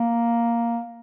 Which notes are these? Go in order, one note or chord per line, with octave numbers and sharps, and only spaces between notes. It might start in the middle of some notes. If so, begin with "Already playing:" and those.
Already playing: A#3